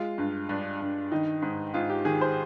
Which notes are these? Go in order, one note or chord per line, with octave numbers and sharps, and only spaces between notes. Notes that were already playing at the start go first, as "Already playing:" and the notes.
Already playing: G#3 F4
G2
G2 D4
G2
D#3 D#4
G#2
G#2 F4
G4
D#3 G#4
C5